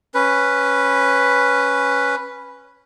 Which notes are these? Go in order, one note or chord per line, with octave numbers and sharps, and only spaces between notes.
C#4 B4